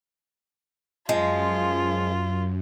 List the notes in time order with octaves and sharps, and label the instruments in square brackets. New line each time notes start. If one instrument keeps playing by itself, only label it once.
[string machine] F#2 [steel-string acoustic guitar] F3 G#3 [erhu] F4